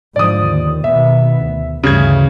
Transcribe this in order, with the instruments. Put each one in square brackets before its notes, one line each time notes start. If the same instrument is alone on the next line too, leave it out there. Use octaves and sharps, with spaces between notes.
[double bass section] G#2 D3 F3 [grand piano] D5 D#6
[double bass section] D#2
[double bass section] B2 D#3 B3 [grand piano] E5
[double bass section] D2
[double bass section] D2 G2 E3 [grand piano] C#3 G#6